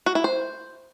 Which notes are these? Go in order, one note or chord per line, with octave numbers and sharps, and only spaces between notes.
F#4
E4
C5